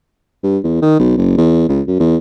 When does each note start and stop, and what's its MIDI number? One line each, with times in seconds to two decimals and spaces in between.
0.43 0.58 43
0.64 0.78 40
0.82 0.99 51
0.99 1.17 35
1.18 1.37 30
1.37 1.66 40
1.69 1.81 37
1.88 1.97 42
1.99 2.17 40